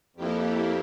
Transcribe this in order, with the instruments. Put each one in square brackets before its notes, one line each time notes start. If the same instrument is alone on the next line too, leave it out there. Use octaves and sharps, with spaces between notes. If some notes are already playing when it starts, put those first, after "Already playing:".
[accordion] F2 [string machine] A#3 E4 G4